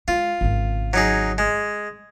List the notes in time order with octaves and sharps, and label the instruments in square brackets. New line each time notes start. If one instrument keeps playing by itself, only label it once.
[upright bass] G#3 [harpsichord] F4
[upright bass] G#1 C#3
[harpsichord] F#3 D#4 G#4
G#3